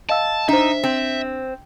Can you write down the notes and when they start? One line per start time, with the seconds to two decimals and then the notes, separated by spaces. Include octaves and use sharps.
0.09 D#5 F5 A5 E6
0.49 D4 D#4 C5 E5
0.84 C4